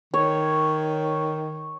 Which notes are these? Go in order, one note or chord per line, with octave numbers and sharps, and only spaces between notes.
D#3 C#5